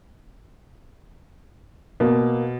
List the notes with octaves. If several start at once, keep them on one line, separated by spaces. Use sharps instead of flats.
B2 A#3